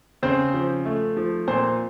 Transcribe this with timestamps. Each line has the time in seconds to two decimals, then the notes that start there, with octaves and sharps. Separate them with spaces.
0.23 C#3 C4 C5
0.54 F3
0.85 A3
1.17 F3
1.48 A#2 C4 C5